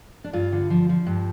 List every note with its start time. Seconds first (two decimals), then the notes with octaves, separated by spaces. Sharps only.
0.24 D4
0.33 G2 F4
0.52 D3
0.70 F3
0.89 F3
1.06 G2